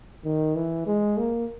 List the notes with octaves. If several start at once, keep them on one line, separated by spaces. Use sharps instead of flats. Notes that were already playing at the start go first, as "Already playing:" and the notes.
D#3
E3
G#3
A#3